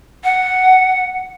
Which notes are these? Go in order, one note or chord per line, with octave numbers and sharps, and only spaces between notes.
F#5